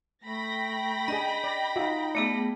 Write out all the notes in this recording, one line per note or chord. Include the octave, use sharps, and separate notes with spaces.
A3 G5 B5 A#6
D4 G#4 D#5
D5
D#4 F4 F#4 E5
A3 B3 G#4 D5 E5